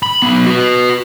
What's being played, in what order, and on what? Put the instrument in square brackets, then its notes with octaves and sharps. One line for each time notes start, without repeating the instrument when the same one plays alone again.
[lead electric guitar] B5
F#3 B3
F#4 B4